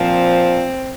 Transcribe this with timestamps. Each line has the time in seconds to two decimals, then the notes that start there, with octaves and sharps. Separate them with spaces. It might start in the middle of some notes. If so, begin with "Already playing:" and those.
Already playing: A#2 F3 C4